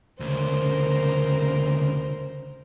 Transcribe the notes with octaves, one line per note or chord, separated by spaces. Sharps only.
D2 C#3 A#4 C5